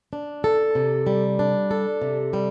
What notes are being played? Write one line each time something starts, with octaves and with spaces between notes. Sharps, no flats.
D4
A4
C3
G3
D4
A4
C3
G3